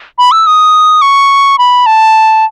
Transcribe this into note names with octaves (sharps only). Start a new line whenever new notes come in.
B5
E6
D#6
C#6
B5
A5